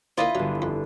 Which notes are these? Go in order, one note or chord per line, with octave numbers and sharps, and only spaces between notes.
A#3 D4 E4 F4 B4 C5 D#5
G1 F#3 D4
F2